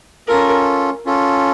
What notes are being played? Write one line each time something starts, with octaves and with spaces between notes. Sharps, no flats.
C#4 F4 A4 A#4
C#4 F4 A4